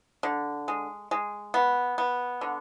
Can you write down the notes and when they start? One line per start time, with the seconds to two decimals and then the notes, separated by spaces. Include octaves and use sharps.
0.23 D3
0.68 G#3
1.11 G#3
1.54 B3
1.98 B3
2.41 D3